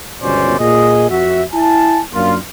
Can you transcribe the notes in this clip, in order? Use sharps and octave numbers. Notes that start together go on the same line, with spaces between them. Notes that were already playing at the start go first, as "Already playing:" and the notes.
G1 C#2 B2 C#4 C5 D5
A#2 G#4 D#5
F2 F#4 E5
E4 G#5 A5
F#2 A#3 D4 F4